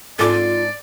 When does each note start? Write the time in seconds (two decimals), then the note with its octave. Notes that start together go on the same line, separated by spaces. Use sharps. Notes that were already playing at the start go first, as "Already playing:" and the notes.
0.19 G#2 C4 D4 F4 A4 D5 D6